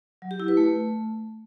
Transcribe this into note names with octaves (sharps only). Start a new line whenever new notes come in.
F#3
G4
E4
B4
A3